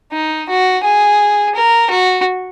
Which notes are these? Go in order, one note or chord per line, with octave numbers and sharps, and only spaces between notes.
D#4
F#4
G#4
A#4
F#4